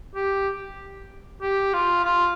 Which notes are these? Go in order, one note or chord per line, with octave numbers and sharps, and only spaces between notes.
G4
G4
F4
F4